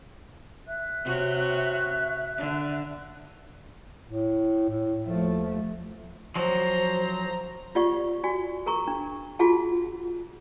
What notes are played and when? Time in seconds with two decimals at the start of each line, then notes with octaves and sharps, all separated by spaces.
0.68 E5 F#6
1.04 C3 F#4 C#5
2.38 D3
4.07 A2
4.69 A2
5.05 D#2 F3 A3
6.36 F3 F#3 C5 A#5
7.75 F4 G4 D5 F#5 C#6
8.24 F#4 D5 G#5
8.66 G#4 A#4 A#5 C#6
8.88 D4
9.39 F4 F#4 G#4 F#5 A5